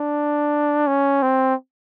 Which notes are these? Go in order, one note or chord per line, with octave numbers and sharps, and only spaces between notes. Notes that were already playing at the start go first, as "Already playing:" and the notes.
Already playing: D4
C#4
C4